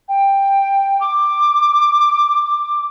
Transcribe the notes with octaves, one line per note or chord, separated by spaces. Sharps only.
G5
D6